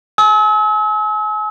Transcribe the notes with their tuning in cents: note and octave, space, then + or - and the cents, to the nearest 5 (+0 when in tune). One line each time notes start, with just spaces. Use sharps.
G#5 +35 E6 -40